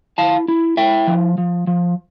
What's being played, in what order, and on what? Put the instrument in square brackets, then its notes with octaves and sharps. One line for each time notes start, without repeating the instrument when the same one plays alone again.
[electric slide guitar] E4 F5 A5
E4
E4 E5 G5
F3
F3
F3